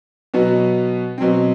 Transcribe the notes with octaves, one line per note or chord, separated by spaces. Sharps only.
B2 F#3 B3 F#4
B2 F#3 C4